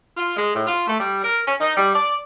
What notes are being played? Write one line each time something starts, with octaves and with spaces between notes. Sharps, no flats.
F4
G#3
A2
F4
A3
G3
A#4
C#4
D#4
G3
D5